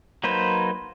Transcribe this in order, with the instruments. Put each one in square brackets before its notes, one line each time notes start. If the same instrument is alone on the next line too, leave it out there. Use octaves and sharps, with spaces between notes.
[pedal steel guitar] F#3 A#3 D#4 B4 C5